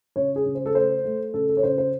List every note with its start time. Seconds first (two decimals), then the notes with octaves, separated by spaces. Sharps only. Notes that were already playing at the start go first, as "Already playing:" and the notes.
0.16 C#3 C#5
0.36 G#4
0.46 C#3
0.55 C5
0.66 A4
0.75 A3 C5
1.04 A3
1.34 C#3 A4
1.49 A4
1.57 C#5
1.63 C#3 C5
1.78 C5